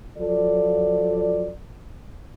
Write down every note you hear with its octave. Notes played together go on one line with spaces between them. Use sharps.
F3 F#3 F4 A4 D5